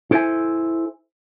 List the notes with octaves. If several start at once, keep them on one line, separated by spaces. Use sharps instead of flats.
E4 A4 C5 C#5 E5 G#5